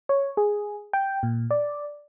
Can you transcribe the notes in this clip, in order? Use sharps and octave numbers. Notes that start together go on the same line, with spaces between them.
C#5
G#4
G5
A#2
D5